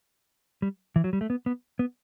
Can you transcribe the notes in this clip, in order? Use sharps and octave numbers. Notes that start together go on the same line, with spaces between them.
G3
E3
F#3
G3
A3
B3
B3
B3